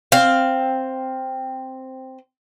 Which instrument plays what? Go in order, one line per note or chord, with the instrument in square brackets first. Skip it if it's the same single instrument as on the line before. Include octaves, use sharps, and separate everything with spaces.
[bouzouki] C4 F5